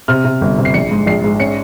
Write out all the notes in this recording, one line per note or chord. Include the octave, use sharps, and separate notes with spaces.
C3 F6
C3
G1
C3
C7
A#1 C#7
G#2
A#1 C7
G#2
C#4 C#7